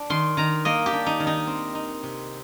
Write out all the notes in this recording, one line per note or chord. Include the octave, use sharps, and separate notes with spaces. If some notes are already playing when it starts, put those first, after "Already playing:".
Already playing: D4
D#3 C6
D#3 A#5
A#3 D#5
G4
D4
D#4
D#3
D#4
C4
D#4
C3